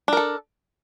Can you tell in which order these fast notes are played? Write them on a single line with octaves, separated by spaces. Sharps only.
D4 A#4 A4